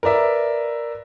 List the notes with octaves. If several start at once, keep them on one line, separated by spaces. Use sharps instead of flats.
A#4 B4 D5 E5